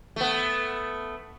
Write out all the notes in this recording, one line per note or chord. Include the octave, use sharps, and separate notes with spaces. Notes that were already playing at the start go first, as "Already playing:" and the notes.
A3 B3